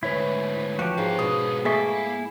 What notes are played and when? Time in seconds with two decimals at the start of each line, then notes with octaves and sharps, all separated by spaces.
0.03 D2 G#2 E4 B4 C#5 B6
0.79 F3 F#4 G4
0.98 G#2 B3 F5
1.19 B2 D#6
1.65 A3 A#3 G#4 A4 E5 G#5 C6 C#6
1.87 E4